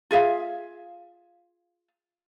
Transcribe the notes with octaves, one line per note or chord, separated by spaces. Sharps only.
F4 G#4 E5 F5